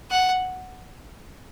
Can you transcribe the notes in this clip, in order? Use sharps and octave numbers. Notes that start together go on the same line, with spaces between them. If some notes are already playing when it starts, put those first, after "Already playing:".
F#5